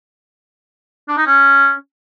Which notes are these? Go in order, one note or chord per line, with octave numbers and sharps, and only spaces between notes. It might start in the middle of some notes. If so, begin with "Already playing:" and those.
D4
D#4
C#4